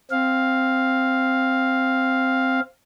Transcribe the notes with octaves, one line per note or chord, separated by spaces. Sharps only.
C4 F5